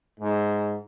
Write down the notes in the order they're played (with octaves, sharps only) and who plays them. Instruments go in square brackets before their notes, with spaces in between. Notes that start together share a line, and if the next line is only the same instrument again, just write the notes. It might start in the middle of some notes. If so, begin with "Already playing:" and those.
[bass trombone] G#2